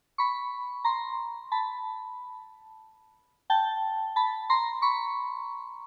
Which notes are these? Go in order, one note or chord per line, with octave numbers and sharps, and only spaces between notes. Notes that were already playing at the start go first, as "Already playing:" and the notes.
B5 C#6
A#5 C6
A5 B5
G5 A5
A5 B5
A#5 C6
B5 C#6